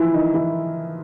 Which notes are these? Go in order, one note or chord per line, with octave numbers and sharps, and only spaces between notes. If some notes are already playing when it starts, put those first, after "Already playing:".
Already playing: E3 F3 E4 F4
D#3 D#4
E3 E4